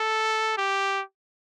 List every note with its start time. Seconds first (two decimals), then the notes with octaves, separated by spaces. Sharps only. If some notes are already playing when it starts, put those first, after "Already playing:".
Already playing: A4
0.58 G4